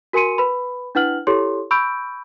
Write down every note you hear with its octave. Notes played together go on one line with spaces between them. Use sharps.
F#4 A#4 G#5 C6 C#7 D#7
B4 B5
D4 E4 B4 F#5 F6 F#7
E4 G4 A4 C#5 C6
B5 C#6 E6 G6 D7